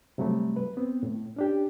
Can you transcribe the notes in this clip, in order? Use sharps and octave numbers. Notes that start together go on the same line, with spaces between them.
C3 F#3 G3 A3
B4
B3 C4
A2
C#4 D4 G4